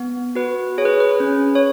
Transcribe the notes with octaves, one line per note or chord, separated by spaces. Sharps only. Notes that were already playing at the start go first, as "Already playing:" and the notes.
Already playing: B3
F#4 B4
G#4 C#5
B4
B4
C#4
C#5